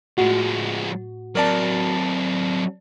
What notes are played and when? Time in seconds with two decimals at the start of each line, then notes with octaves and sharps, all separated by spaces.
0.18 A2 F3 G#3 F#4
1.35 F#3 C4 A#4 D5 A5